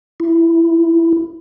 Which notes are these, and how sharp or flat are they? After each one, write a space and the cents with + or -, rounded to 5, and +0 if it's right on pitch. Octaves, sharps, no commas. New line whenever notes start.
E4 +15